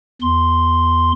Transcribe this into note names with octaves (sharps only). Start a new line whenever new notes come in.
E2 C6